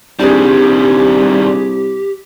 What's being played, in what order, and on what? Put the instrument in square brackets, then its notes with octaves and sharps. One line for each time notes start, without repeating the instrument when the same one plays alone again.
[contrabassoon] C2 [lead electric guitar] D#3 G3 [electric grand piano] D4 G#4 [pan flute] G4